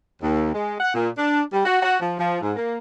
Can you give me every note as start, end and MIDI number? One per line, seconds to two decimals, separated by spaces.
0.21 0.50 39
0.53 0.75 56
0.79 0.91 78
0.93 1.07 46
1.16 1.43 62
1.52 1.61 55
1.64 1.79 66
1.82 1.96 66
2.00 2.17 53
2.18 2.39 53
2.40 2.53 44
2.55 2.77 58